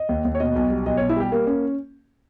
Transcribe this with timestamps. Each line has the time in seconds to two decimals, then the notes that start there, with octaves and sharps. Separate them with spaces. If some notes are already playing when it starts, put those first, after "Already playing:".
Already playing: D#5
0.09 D#2
0.25 D#2
0.35 C#5
0.40 B2 D#5
0.56 B1
0.70 G3
0.86 B1 D#5
0.97 C#5
1.01 B2
1.09 E4
1.16 G3 G4
1.32 A#3 A#4
1.47 C#4